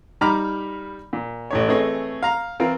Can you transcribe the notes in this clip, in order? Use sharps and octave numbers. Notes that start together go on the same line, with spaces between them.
G3 D#4 A#5 B5 D6 F6
A#2
A1 A2 C#5
E3 A3 C4 G#4 C#5 D#5
F5 A#5
E3 C4 F4 A#4